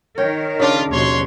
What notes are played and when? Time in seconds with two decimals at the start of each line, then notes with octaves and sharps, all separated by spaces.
0.18 D#3 A#4 C#5 G5
0.60 C#3 D4 F4
0.91 D#2 B2 F3 C#5 C6